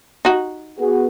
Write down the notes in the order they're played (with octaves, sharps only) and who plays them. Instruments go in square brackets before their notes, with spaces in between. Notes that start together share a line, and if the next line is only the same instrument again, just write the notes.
[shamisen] D#4 F#4
[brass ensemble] B3 F#4 G#4